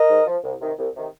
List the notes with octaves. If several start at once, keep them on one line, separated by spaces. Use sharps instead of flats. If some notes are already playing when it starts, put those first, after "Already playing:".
Already playing: A#4 D#5
G#2
F3
C2
C3 D#3
C2
C3 D#3